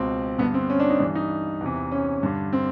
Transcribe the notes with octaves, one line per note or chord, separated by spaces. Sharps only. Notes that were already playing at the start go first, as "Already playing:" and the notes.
Already playing: C#2 B2 C4
G2 D3 B3
C4
C#4
D4
D#4
G2 E3 D4
D#4
E2 C3 E3
C#4
G2 D3
C4